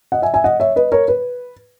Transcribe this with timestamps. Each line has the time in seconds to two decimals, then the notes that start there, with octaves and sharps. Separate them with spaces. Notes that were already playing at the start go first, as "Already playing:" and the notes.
0.12 D#5 F#5
0.22 E5 G#5
0.34 E5 G#5
0.44 D#5 F#5
0.60 C#5 E5
0.76 B4 D#5
0.92 A#4 C#5
1.08 B4